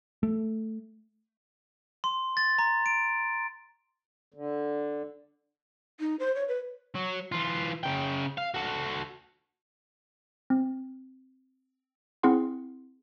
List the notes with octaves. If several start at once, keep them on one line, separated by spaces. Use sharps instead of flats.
A3
C6
A6
A#5
D7
D3
D#4
C5
C#5
B4
F#3
E3 F4
C#3 G5
F5
F#4 A4
C4
C4 E4 G#4 F#5 C6